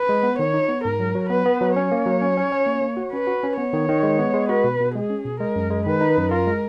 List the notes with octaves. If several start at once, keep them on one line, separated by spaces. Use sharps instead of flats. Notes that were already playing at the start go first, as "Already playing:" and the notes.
Already playing: B4
G#3
B3
D#3 C#5
D#4
B3
G#2 A#4
F#3
F#3
B3 B4
B3
F#3
C#4 C#5
A#3
F#3
C#4
C#4
C#4
A#3
A#3
F#4
C#4 B4
F#4
C#4
B3 C#5
D#3
D#3
G#3
B3
G#3
F#4 B4
B2
B2
G#3 G#4
C#4
B2
G#3 A#4
F#2
G#3
D#3 B4
D#4
F#2
F4 A#4
G#3